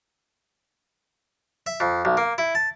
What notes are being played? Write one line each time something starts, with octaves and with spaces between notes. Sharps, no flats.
E5
F2
B1
A#3
E4
A5